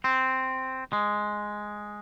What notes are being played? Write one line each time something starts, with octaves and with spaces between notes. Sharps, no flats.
C4
G#3